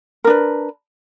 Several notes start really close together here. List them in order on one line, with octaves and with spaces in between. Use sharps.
A#4 D4 B4